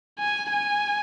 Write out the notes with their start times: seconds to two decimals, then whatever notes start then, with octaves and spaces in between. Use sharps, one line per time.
0.19 G#5
0.51 G#5